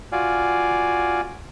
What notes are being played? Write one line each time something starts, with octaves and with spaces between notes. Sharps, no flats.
F4 F#4 D5 F5 G#5